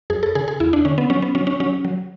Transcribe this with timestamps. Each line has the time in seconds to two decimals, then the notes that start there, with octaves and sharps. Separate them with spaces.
0.10 F#2 G#4
0.23 A4
0.35 C#3 G#4
0.48 G#4
0.60 E2 E4
0.73 D4
0.85 D3 C#4
0.98 B3
1.10 F#3 C#4
1.22 B3
1.35 F#3 C#4
1.47 C#4
1.60 F#3 C#4
1.85 F#3